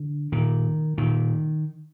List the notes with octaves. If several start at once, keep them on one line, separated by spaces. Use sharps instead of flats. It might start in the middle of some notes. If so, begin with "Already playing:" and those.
Already playing: D3
A#2 D#3
A#2 D#3